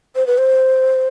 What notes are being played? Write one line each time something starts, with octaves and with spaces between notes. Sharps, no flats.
C5
B4
C5